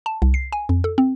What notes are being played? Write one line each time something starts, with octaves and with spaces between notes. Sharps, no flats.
A5
C2
C7
G#5
F2
A4
C4